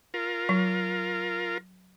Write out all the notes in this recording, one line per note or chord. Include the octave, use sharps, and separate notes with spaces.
F4 A#4
F#3